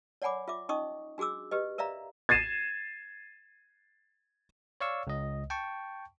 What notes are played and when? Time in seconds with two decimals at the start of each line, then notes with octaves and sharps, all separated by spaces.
0.22 C#5 D5 F#5 G#5 B5 D6
0.48 F4 E5 D6
0.69 C#4 D#4 D#5 C#6 D#6
1.18 D4 F#4 G#4 D6 E6
1.51 G4 B4 D#5
1.78 A#4 D5 E5 F5 A#5
2.29 G#6 A6 C7 D#7 E7
4.81 C#5 D5 F5 C#6 E6
5.07 C#2 D#5
5.50 G5 A5 C#6